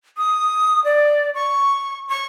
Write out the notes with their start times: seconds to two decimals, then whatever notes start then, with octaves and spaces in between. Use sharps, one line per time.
0.18 D#6
0.85 D5
1.35 C#6
2.08 C#6